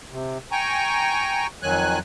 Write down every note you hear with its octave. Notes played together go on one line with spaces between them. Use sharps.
C3
G5 G#5 A#5 C#6
F2 D#3 F#3 G#5 F#6